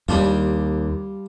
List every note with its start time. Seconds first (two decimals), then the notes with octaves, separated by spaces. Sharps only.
0.09 D#2 G3 D4 F4